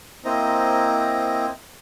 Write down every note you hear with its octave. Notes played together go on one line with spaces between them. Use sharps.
A#3 C4 E4 C5 D#5 A#5